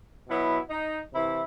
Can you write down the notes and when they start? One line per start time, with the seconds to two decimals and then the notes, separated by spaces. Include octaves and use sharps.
0.28 B2 F#3 B3 E4
0.70 D#4
1.13 C3 E3 E4